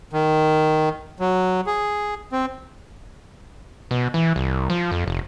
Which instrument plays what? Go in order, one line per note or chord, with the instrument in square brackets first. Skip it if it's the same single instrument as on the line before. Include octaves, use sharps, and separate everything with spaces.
[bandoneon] D#3
F#3
G#4
C4
[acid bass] B2
E3
C2
F3
F2
F1